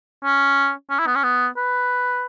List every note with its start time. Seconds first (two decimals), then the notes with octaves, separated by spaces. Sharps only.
0.24 C#4
0.90 C#4
0.99 E4
1.07 B3
1.16 C#4
1.24 B3
1.57 B4